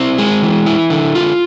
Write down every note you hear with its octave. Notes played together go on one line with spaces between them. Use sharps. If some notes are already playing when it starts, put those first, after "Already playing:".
Already playing: C4 E4
G#3
E3
E4
D3
F4